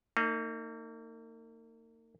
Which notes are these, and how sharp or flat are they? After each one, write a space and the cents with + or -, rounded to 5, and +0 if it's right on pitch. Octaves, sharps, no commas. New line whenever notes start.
A#3 -40 D#4 +5